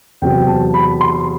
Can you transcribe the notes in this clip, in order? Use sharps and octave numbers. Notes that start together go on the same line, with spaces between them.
E2 C3 F#3 G5
A5
B5
C6